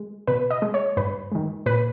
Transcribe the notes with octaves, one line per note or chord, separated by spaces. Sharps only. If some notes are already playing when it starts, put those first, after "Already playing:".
Already playing: G#3
B2 B4
D#5
G#3
C#5
G2 B4
D#3 G#3
A#2 B4